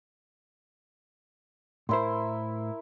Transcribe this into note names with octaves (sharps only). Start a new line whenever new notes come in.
A2 E4 A#4 C5 C6